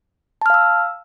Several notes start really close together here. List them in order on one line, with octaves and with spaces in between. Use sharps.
A5 F6 F5 E6